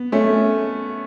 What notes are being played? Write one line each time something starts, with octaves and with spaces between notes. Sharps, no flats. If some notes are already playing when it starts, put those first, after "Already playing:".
Already playing: B3
A3 C#4